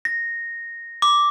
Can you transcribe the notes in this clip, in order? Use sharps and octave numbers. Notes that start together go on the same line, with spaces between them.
A#6
D6